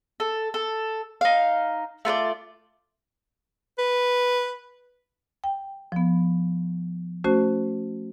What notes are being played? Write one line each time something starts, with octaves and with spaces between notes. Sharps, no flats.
A4
A4
D#4 F5
A3 F4 A#4 D5
B4
G5
F3 B3
A3 C#4 F#4 C5